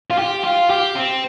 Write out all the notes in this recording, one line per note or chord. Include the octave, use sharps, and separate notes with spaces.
F4
G4
F4
G4
C4